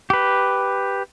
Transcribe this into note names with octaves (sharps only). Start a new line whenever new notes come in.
G4 B4